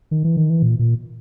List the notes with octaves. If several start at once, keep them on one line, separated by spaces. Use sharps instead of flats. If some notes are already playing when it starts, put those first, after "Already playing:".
D#3
E3
D#3
E3
A#2
A#2